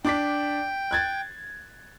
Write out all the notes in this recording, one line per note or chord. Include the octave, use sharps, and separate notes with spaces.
D4 G5 D6 B6
F#6 G#6 A6